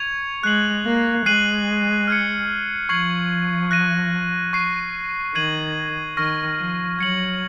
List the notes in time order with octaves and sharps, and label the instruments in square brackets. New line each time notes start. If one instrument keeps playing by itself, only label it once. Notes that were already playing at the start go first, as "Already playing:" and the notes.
Already playing: [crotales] C#6 G#6 C#7 F7
[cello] G#3 [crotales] F#6 C7 F#7
[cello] A#3
[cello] G#3 [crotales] F#6 C7 D#7 F#7
[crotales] F6 G#6 C#7
[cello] F3 [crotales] C#6 G#6 C7 F#7
[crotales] F#6 A#6 D#7
C#6 F#6 C7 D#7
[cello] D#3 [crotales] G#6 C7 D#7 F#7
[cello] D#3 [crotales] C#6 F6 A#6
[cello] F3
[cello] F#3 [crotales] G#6 C#7 F#7